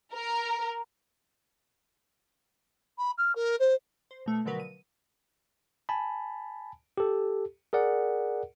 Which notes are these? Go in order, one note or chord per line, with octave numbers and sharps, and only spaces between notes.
A#4
B5
F6
A#4
C5
C5
B2 A3
B2 D3 F3 F#3 A#4 B4
D#7
G#5 A5 B5
G4 A4
G#4 A#4 D5 F#5